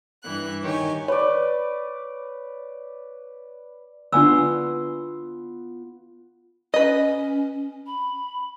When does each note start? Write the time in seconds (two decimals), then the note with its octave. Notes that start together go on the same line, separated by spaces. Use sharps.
0.22 G2 E3 F#6
0.63 D#3 G4 C#5 G#5
1.08 B4 C#5 D5
4.13 D3 B3 D4 F4 D5 G#5 E6
6.74 C#4 B4 D#5
7.87 B5